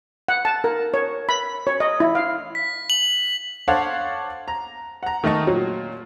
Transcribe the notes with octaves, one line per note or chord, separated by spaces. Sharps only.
F#5
A5
A#4
C#5
B5
C#5
D#5
E4
F5
B6
F#7
D4 A4 C5 C#5 F5 F#5
A#5
F#5 A#5
D#3 A3 D#5 C#6
A#2 F#3